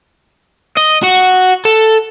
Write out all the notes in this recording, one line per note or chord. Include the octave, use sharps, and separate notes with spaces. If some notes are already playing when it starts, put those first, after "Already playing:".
D#5
F#4
A4